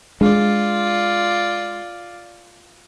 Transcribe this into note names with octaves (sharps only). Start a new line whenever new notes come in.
G#3 D4 F4 D5